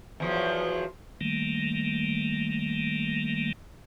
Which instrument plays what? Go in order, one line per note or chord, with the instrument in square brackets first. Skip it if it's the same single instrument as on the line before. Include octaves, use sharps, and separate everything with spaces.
[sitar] E2 F3 F#3
[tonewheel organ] D#3 G3 A3 A#3